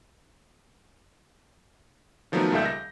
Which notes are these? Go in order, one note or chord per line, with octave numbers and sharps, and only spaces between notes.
D#3 F3 F#3 A3 B3 D#4
C#2 A#2 G3 A4 E5 G6
A#6